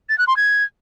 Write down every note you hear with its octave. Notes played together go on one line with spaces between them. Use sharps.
A6
F#6
C6
G#6